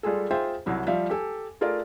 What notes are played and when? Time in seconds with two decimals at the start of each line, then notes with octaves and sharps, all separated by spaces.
0.03 G3 G#3 F4 G#4 A4
0.31 F4 G#4 C5 E5 G5
0.66 C2 F#3 E4
0.87 F3 G3 E5 F5
1.10 G4 A4 G#5
1.61 A3 F4 G#4 A#4 D5